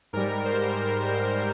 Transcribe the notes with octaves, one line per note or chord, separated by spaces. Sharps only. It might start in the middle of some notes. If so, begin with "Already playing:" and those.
G#2 G3 A#4
C5
C5